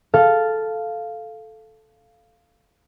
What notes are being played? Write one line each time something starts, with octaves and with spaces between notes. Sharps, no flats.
A4 F5